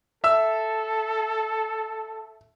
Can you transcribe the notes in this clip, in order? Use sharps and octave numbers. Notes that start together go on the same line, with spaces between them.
A4 E5 E6